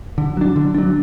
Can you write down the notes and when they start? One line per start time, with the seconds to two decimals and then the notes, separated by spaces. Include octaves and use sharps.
0.18 D3
0.37 F#3 D4
0.56 D3
0.74 F#3 D4